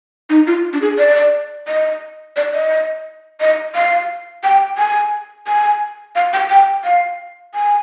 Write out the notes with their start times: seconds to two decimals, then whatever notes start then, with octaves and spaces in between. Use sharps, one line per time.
0.30 D#4
0.47 F4
0.73 D4
0.82 G#4
0.99 D5
1.68 D#5
2.36 D5
2.54 D#5
3.40 D#5
3.75 F5
4.44 G5
4.78 G#5
5.47 G#5
6.15 F5
6.33 G5
6.50 G5
6.84 F5
7.54 G#5